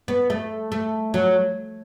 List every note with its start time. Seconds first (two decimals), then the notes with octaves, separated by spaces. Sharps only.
0.08 B3
0.30 A3
0.72 A3
1.14 F#3